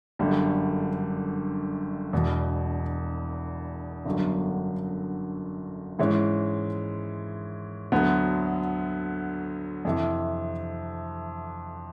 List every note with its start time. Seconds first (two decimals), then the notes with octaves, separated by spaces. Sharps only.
0.19 G1 F#2 D3 G3
2.13 E1 E2 B2
4.05 G1 F#2 D3 F#3 B3
5.99 G#2 E3 G#3 C#4
7.92 D2 D3 F#3 B3
9.85 F2 C3 E3